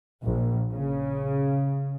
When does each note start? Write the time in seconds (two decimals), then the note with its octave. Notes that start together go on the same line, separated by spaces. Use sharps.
0.23 A#1
0.71 C#3